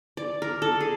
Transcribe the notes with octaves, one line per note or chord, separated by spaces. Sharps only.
D5
A#4
A4
G#4